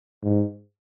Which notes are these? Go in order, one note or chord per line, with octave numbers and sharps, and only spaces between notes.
G#2